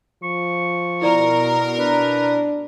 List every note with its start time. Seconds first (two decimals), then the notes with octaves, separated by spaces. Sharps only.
0.23 F3 C#6
1.02 B2 E4 A#4 D5 A#5
1.79 D4 B4